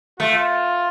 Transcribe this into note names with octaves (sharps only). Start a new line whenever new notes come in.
A3 F4